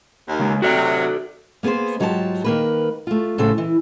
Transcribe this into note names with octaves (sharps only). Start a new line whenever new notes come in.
D#2
C#3 G#3
C3 F#3 F#4 A4 D5
A#3 B3 G#4 B4 C5
G#2 F#3 F4 G4 C5 A5
D#3 A#3 B4
A3 F4
A2 C#3 F#3 A4 C5
E3